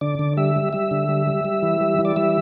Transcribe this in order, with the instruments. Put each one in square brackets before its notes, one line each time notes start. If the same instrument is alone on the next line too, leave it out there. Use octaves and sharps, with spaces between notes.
[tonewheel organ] D3 D5
D3
G3 E5
G3
G3 E5
D3
G3
G3
G3
E3
G3
E3
D5
G3 E5